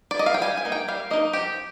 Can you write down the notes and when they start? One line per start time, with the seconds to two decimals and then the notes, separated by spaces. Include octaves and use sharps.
0.11 D5
0.19 D#5
0.26 F5
0.34 G5
0.41 G3 G#5
0.57 G#5
0.65 A#3 D#4
0.72 G5
0.88 G3 F5
1.11 A#3 D#4 D#5
1.33 F3 G4